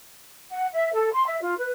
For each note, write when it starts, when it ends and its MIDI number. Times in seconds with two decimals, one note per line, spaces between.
0.51 0.67 78
0.72 0.90 76
0.92 1.11 69
1.12 1.24 84
1.26 1.38 76
1.41 1.54 65
1.57 1.71 71